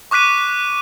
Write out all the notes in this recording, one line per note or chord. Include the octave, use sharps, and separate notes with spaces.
C#6 D6 F#6 B6 D#7